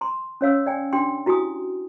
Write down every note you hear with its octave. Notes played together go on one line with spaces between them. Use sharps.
A#5 C6
C#4 C#5 F5 E6
D5 G5 G#5
D4 G4 G5 C6
E4 F#4 G4 G#5 D#6